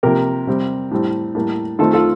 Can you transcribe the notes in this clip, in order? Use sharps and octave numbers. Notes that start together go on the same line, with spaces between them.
C3 F3 A#3 G4 A#4
C3 G3 C4
A2 G3 C4
A2 G3 A#3
D#3 A3 C4 F4 A4
F4 A4